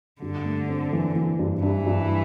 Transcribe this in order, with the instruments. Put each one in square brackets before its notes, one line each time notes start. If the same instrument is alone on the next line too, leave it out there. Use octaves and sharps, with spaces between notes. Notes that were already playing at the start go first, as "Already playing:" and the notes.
[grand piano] G2 [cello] D3
[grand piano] A3
C4
E3
E3
G2
[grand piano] G2 [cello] E3
[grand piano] G2